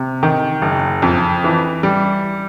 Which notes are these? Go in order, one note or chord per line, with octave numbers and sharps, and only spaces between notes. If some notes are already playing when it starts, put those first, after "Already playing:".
Already playing: C3
D#3
F#1
F2
E3
G3